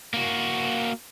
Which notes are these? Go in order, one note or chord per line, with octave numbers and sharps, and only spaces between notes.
A#3 F#4